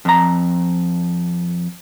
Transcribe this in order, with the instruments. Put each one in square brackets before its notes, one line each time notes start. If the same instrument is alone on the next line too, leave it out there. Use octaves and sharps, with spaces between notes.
[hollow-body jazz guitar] F2 A#5